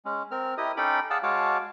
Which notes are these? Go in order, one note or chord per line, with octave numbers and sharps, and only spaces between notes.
G#3 C#4
C4 A#4 F6
E4 G4 A#4 D#5 D#6
C#4 D#4 A4 G5 B5 D6
G#4 D5 F5 F#5 A5 E6
G#3 F#4 C#5 F5 A5 D6